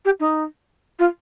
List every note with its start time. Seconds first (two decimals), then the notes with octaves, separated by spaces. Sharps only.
0.05 G4
0.20 D#4
0.99 F4